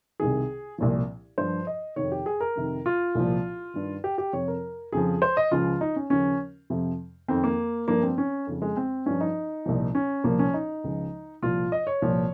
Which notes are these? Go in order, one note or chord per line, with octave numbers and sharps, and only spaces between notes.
C2 C3 D#3 G#4
C2 A#2 F3
G2 F3 C5
D#5
F2 C3 D#3 C#5
G4
G#4
A#4
F2 C3 D#3
F4
C2 A#2 F3
G2 D#3
G4
G4
F2 C3 F3 C#5
A#4
F2 C#3 F3 G#4
C5
D#5
C#2 C#3 F3 F4
D#4
C#4
D#2 C#3 F3 C#4
F2 C3 F3
F2 D#3 C4
A#3
G2 F3 A#3
C4
C#4
F2 C#3 F3
G#3
C4
G2 F3 C#4
D#4
C2 A#2 F3
C#4
C2 A#2 F3 A#3
C#4
D#4
C#2 C#3 F3
C2 A#2 F3 F4
D#5
C#5
C2 A#2 F3